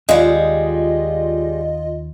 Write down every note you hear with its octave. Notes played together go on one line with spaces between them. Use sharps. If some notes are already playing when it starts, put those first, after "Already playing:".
D#2 G3 G#3 F4 D#5